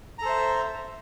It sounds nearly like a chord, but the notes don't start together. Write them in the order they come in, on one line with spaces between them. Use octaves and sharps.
A#5 A4 C5 E5